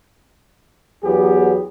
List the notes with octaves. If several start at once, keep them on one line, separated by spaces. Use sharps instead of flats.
E2 F#3 B3 G4 G#4